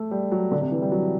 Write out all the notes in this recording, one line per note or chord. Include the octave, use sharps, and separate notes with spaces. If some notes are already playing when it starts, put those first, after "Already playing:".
Already playing: A3
G3
F#3
D3
C3
E3
G3
F#3